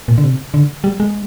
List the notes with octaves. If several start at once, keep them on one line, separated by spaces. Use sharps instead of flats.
A#2
D3
C3
D3
G3
G#3